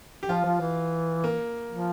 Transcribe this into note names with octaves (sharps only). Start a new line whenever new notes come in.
G4
F3 F4
F3
E3
A#3
F3